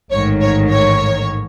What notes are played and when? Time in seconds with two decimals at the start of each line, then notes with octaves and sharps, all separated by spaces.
0.10 A1 G#2 D#3 C#5
0.41 C#5
0.70 C#5